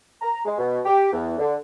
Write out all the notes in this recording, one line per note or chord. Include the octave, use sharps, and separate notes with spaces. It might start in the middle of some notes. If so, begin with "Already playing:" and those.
A#5
G#3
B2
G4
E2
D3